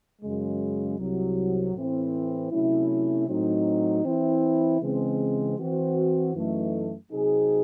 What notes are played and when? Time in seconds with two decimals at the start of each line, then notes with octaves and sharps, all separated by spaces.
0.20 F#2 C#3 G#3
0.98 C2 C3 F#3
1.73 A2 E3 C4
2.51 C3 F#3 A3 C#4 E4
3.27 A2 F#3 C4 D#4
4.04 E3 C4 E4
4.81 C#3 E3 G#3 C4
5.57 E3 C4 F#4 C5
6.34 F#2 E3 A3 D#4
7.10 C3 F#3 C4 D#4 G#4